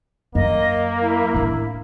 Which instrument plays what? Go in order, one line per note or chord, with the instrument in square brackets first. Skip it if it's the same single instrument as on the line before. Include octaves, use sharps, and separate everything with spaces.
[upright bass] F#2 [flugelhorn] A#3 [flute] D#5
[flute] E4
[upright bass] A2 D4